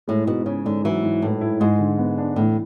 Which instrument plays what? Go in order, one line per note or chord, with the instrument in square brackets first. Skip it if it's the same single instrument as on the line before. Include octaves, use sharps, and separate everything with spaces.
[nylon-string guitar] A2 [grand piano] G#3
[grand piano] G#2 [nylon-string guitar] B2
[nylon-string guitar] C#3 [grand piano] C#4
[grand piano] G#2 [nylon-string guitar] D3
[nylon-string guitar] E3 [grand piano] F#3
[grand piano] G#2
[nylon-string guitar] A2 [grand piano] A3
[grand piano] E4
[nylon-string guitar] G#2 [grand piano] G#3
[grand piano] D3
B3
D4
[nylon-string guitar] A2 [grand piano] E3